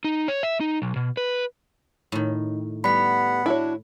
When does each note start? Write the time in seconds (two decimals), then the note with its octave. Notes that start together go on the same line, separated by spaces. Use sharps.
0.05 D#4
0.28 C#5
0.43 E5
0.60 D#4
0.82 B1
0.96 B2
1.17 B4
2.12 A2 D#3
2.84 G3 B3 F#5 B5 B6
3.46 D4 E4 F#4 C#5